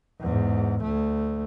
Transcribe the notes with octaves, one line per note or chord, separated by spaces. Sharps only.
E2 G#2
D2 A3